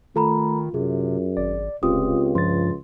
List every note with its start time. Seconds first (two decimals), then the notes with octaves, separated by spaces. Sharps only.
0.16 D#3 A3 F4 A4 A#5 B5
0.74 F#2 C3 G#4
1.37 G#1 D5
1.83 F1 C#2 C4 F4 G4 D#6
2.35 G2 F3 C6 A6